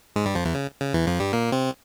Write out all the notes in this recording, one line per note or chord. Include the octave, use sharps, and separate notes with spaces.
G#2 G#3
G2 G3
F2 F3
E2 E3
C#3
C#3
E2 E3
F2 F3
G2 G3
A#2 A#3
C3 C4